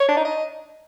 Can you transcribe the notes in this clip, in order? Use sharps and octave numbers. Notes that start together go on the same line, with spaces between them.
C#5
D4
D#4
D#5